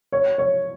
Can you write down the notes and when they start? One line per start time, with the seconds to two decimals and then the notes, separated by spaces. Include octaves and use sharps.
0.12 C#5
0.38 C#5